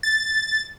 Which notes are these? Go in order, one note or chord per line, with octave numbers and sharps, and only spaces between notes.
A6